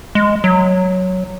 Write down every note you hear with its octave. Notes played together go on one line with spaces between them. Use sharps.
G#3
F#3